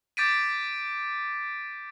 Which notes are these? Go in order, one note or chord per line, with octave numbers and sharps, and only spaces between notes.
D6 G6 A6 B6 D7 D#7